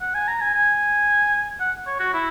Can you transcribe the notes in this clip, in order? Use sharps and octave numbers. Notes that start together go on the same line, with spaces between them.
F#5
G#5
A#5
G#5
G#5
F#5
C#5
F#4
E4